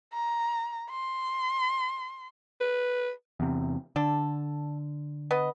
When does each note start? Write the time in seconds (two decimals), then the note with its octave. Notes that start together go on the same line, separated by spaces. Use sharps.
0.14 A#5
0.90 C6
2.61 B4
3.40 E2 C3
3.96 D3 D4 A4
5.31 B3 B4 D#5